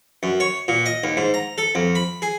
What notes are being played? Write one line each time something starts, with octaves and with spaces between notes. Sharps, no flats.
F#2
C#5
A#2
D#5
D#2
G#2
A#5
A4
F2
B5
G#4